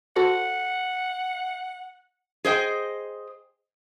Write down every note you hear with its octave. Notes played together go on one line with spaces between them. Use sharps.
F#4 A4 C5 F#5
G#4 C5 D#5 G5